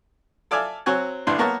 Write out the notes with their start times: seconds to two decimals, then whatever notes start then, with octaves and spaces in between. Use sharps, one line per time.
0.51 A4 D5 E5 F5 G#5
0.86 F#3 C4 C#5 F#5 G#5
1.27 A1 E3 D4 C6
1.38 A#3 B3 A#4 C#5 A5